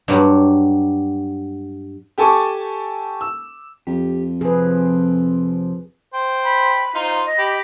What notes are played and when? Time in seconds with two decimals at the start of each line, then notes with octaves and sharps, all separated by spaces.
0.08 G2 F#3 G3
2.18 G4 A4 G#5 A5 C#6 D6
3.21 E6
3.87 F2 G4
4.41 C3 F3 C4 G#4 B4
6.14 C5 G5
6.44 B5
6.95 D#4 F4 C5
7.25 D#5
7.38 G4 B5